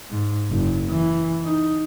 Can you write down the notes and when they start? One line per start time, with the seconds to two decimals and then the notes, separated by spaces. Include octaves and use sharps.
0.11 G#2
0.50 F#1
0.89 E3
1.44 D#4